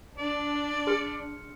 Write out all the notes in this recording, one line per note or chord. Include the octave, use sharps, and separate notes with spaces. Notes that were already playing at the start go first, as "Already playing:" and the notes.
D4 D5
G#4 C6 F6 C#7